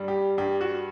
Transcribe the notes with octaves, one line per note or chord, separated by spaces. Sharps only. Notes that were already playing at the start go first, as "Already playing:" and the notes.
Already playing: G2 G3
G4
G2 G4
F#4